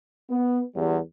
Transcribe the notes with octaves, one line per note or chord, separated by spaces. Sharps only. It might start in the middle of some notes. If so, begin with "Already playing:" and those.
B3
E2 G3